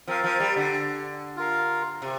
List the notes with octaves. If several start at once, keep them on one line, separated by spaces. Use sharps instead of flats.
F3 C4 A#4 F5
F3
G3
D3
F4 A#4 F5
C3